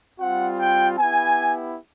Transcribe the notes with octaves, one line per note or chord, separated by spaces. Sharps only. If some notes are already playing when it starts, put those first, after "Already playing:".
G3 C4 F4 F#5
G5
B3 E4 G4 G#5